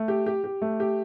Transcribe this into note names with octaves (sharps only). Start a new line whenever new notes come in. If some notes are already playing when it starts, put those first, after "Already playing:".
Already playing: A3
G4
G4
G4
A3
G4